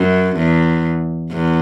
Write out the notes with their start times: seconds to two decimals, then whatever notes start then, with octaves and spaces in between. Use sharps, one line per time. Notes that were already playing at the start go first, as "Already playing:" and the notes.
Already playing: F#2
0.36 E2
1.31 E2